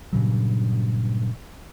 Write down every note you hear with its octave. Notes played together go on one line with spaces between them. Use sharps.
G2 A#2 C#3 F#3